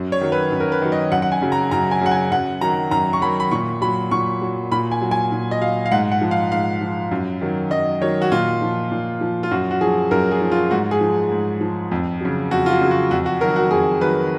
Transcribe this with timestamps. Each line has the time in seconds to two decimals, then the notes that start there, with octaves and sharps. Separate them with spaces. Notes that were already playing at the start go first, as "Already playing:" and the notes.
Already playing: F#2
0.12 C#5
0.21 D#3 F#3
0.32 B4
0.52 F#2
0.60 A#4
0.72 B4
0.82 D#3 F#3
0.92 D#5
1.12 F#2 F#5
1.22 F#5
1.32 G#5
1.42 C#3 F#3
1.52 A#5
1.71 F#2 A#5
1.91 G#5
2.01 C#3 F#3 F#5
2.12 G#5
2.31 F#2 F#5
2.61 D#3 F#3 A#5
2.91 F#2 A#5
3.13 C#6
3.22 D#3 F#3 B5
3.40 B5
3.51 A#2 C#6
3.82 F#3 B5
4.11 A#2 C#6
4.42 F#3
4.72 A#2 B5
4.92 G#5
5.02 F#3
5.11 G#5
5.32 A#2
5.51 D#5
5.61 F#3 F5
5.86 F5
5.92 G#2 F#5
6.12 F#5
6.21 F3
6.31 F5
6.51 G#2 F5
6.81 F3
7.11 F#2
7.42 D#3 F#3
7.71 F#2 D#5
8.01 D#3 F#3 C#5
8.22 F#4
8.32 A#2 F4
8.62 F3
8.91 A#2
9.21 F3
9.43 F4
9.51 F#2 F#4
9.71 F#4
9.81 F3 G#4
10.11 F#2 A#4
10.31 G#4
10.41 F3
10.52 F4
10.71 G#2 F#4
10.91 G#4
11.01 F3
11.31 G#2
11.61 F3
11.91 F2
12.21 C#3 F#3
12.51 F2 F#4
12.66 F4
12.71 F#4
12.81 C#3 F#3
12.91 F#4
13.11 F2 F#4
13.26 F#4
13.41 D#3 F#3 A#4
13.56 F#4
13.71 F2 G#4
14.01 D#3 F#3 B4